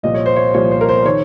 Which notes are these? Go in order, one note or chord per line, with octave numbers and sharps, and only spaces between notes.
C2 A#2 F3 D#5
C#5
C5
C#5
C2 A#2 F3 C#5
C5
A#4
C5
D#3 C#5